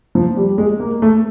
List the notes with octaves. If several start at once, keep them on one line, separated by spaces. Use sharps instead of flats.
F3
G3
G#3
A#3
A3